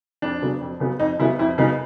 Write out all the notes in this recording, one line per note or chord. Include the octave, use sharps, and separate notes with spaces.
F2 D4
C#3 F#3 B3
F2
C#3 F#3 B3
F2 D#4
C#3 F#3 B3 E4
F2 E4
C#3 F#3 B3 D#4